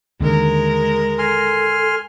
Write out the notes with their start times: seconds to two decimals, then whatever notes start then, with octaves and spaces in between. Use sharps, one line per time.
0.21 D#2 D3 G#3 A#4
1.19 A4 G#5 C6 F6